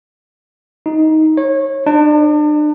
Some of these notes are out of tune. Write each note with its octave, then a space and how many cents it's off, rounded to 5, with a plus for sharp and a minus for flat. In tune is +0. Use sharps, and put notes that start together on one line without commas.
D#4 +15
C#5 -25
D4 +40